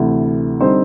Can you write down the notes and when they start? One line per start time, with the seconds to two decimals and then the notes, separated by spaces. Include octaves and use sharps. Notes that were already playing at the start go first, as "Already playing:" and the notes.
Already playing: D2 C3 E3
0.61 D3 G3 C4 D#4 C5